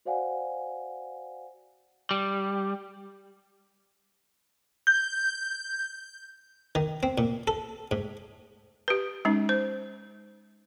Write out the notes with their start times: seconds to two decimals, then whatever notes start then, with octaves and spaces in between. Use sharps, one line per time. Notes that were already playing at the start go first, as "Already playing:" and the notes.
0.05 F#4 C5 D5 F5 F#5 G#5
2.11 G3
4.87 G6
6.75 D#3
7.03 C4
7.18 A#2
7.48 A4
7.91 G#2
8.88 G4 B4
9.25 G#3 C#4 D#4
9.49 C5